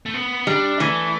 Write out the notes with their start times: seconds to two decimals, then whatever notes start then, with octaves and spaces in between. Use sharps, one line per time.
0.06 A3
0.14 B3
0.47 G3 D4
0.80 E3 A3